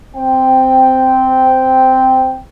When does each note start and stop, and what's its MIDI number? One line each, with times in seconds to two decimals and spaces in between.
0.16 2.37 60
0.16 2.37 79